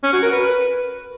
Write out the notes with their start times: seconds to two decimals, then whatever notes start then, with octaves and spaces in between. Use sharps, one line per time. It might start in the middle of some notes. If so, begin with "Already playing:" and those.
0.03 C#4
0.13 F#4
0.23 A#4
0.32 B4